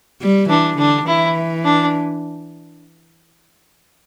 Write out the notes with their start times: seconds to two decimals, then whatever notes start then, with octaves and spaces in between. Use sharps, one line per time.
0.21 G3
0.49 E3 D4
0.78 D3 D4
1.06 E3 E4
1.64 D4